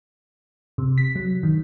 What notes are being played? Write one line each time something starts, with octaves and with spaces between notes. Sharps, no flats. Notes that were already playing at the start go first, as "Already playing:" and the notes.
C3
B6
F#3
D#3